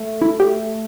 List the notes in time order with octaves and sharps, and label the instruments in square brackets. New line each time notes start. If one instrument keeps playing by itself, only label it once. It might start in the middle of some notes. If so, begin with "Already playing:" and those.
Already playing: [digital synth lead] A3
[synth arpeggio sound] E4
G4